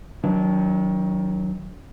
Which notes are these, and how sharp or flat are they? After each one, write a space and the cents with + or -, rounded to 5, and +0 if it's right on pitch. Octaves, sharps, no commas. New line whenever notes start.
D#3 +25 F#3 +0 D4 -25